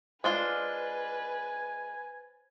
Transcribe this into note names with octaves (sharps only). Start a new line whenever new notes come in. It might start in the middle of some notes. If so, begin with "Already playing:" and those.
G#3 D4 F4 B4 C5 G#5 A6 G7